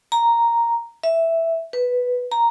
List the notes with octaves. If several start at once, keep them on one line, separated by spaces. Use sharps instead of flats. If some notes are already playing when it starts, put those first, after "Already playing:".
A#5
E5
B4
A#5